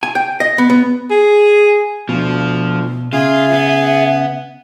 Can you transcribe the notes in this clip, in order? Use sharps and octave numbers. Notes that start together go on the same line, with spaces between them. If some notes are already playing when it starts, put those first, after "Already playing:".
G#5
G5
D#5
B3
B3
G#4
D2 B2 F3
C#3 F4 G#4 E5
B3